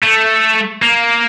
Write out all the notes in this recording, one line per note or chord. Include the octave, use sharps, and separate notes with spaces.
A3
A#3